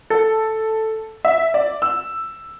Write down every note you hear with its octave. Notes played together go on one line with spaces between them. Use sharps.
A4
E5
D5
E6